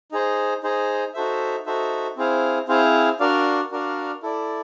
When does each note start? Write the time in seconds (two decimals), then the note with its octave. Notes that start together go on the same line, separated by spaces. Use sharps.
0.12 D#4 G#4 C5
0.63 D#4 G#4 C5
1.14 D#4 F#4 A4 C5 E5
1.66 D#4 F#4 A4 C5 E5
2.17 C4 E4 G#4 C5 F5
2.68 C4 E4 G#4 C5 F5
3.20 D4 F#4 A#4 D5 F5
3.71 D4 F#4 A#4 D5 F5
4.22 E4 A4 D5